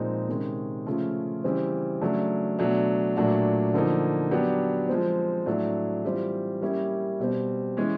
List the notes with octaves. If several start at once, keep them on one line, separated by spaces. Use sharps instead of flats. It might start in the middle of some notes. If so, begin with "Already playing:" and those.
Already playing: A#2 F3 G#3 C4 D#4
C3 D#3 G#3 C#4
C#3 F3 A3 C#4 F4
C#3 E3 G3 C4
C#3 F#3 A3 D4
B2 F#3 A3 D4
A#2 F#3 A3 D4 F#4
D3 F3 A#3 D#4
F#3 B3 D4 G4
F3 G#3 C4
A2 F#3 A3 D4
E3 G3 C4 F4
G3 A#3 C#4 E4 G4
B2 G3 C4
E3 G#3 C#4